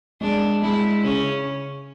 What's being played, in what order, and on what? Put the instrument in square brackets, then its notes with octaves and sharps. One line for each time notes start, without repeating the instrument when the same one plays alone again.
[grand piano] G#3 [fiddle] D4
[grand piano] G#3 [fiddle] E4
[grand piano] C#3 [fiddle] C#4